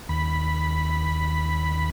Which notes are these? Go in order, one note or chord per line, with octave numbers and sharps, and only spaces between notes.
D#2 B5